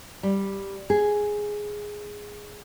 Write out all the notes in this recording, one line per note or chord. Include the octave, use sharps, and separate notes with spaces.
G3
G#4